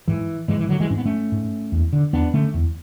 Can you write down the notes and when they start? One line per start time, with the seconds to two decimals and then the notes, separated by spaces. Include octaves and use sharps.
0.08 G#2 E3
0.48 G#2 E3 G#3
0.59 E3
0.69 D3 F#3
0.80 E3 G#3
0.90 G#2 C#4
0.97 B3
1.05 A3 C#4
1.32 G#2
1.72 E2
1.93 D3
2.13 E2 B3 D4
2.34 D3 A3 C#4
2.54 E2